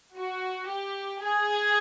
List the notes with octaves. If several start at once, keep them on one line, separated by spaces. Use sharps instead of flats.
F#4
G4
G#4